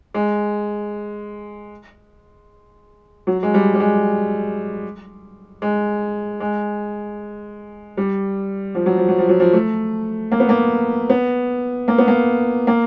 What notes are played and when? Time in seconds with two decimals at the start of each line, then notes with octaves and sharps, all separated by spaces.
0.14 G#3
3.27 F#3
3.43 G#3
3.54 G3
3.74 G3
3.80 G#3
5.62 G#3
6.40 G#3
7.97 G3
8.75 F3
8.86 F#3
8.97 F3
9.08 F#3
9.18 F3
9.29 F#3
9.40 F3
9.53 A3
10.32 A#3
10.40 B3
10.49 A#3
11.10 B3
11.88 A#3
11.98 B3
12.08 A#3
12.67 A#3